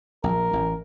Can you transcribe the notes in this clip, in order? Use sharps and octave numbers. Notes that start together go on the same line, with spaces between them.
A#1 A#4
A1